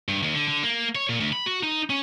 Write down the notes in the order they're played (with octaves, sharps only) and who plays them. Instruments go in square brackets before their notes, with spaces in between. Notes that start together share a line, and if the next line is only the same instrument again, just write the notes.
[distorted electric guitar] G2
D#2
D3
D3
A#3
C#5
A#2
D2
B5
F#4
D#4
C#4